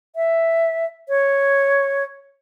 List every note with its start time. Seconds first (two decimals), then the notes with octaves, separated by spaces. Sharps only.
0.16 E5
1.09 C#5